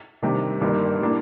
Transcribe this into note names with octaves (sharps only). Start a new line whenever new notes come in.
C3 D#3 G3 D4 G4
G1 G2 D#3 G3 A#3
A2 G3 A#3 D4